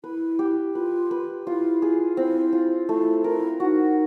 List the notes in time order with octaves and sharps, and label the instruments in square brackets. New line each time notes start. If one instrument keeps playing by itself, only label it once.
[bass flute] E4 [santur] B4
[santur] G4
[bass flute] F4 [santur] B4
[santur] B4
[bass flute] E4 [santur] F4
[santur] G#4
[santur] C4 [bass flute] E4
[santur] F4
[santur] A3 [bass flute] E4
[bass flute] E4 [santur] A#4
[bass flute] D#4 [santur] F#4